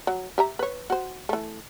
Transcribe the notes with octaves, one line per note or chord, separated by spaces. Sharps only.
F#3
G4 E5 A#5
B4 C#5
F#4 C5
E3 A3